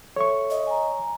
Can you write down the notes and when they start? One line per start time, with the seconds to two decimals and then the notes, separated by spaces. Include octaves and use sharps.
0.16 A4 C#5 E5 C#6
0.50 D#5
0.67 G#5 A#5